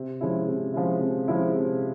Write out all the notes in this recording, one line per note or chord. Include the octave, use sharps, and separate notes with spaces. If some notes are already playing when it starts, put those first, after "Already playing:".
Already playing: C3
F3 G#3 C#4 E4
C3
F3 G#3 C#4 E4
C3
F3 G#3 C#4 E4
C3